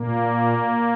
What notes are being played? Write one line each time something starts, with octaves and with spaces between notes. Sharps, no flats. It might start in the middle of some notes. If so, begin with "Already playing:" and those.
Already playing: A#2 A#3